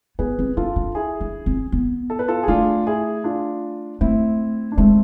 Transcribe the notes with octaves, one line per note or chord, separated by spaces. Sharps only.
B3 G#4 B4
C4
D4 F4 A4
D4
E4 G#4
D4
C4
B3
A4
B4
F4 A4
G#4
A3 D4 F4
E4 G#4
D4 F4
A3 C4 E4
D4
G#3 A3 C4